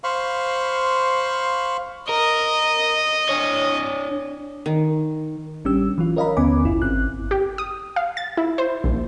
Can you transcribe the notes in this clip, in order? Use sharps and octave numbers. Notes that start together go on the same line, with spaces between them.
C5 F5 B5 C#6
A#4 D#5
D4 C#5
D#3
A1 G3 C#4 D4 G4 E6
E3 F#3 F4
A#4 C#5 D#5 F5 A#5 B5
D#2 D3 B3 C#4 G#5 D6
G#1 F#2 E4 F4
G#1 C4 F#6
G4
D#6
F5
A6
E4
C5
A#1